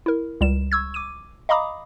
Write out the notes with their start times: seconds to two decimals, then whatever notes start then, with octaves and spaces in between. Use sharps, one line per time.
0.06 E4 A#4
0.41 C#2 G3 E7
0.72 C#6 E6 G#6
0.94 D6 D#7
1.49 D#5 F5 A#5 B5 D6 D#6